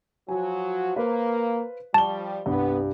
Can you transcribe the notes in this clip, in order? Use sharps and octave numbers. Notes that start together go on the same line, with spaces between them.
F3 F#3 F#4 G#5
A#3 B4 C5 F5
F3 G3 A5 C#6 G7
C2 G2 B3